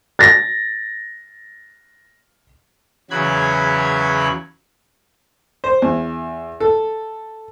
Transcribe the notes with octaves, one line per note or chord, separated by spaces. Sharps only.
A6 A#6
E2 C#3 F#3 B5 F#6 G#6
C5
E2
A4